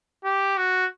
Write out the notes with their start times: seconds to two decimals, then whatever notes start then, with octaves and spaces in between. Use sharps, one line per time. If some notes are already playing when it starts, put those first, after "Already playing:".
0.24 G4
0.57 F#4